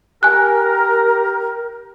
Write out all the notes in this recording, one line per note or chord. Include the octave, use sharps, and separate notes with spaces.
G4 A#4 G#5 F#6